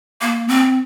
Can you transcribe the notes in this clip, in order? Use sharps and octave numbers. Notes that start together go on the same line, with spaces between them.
A#3
C4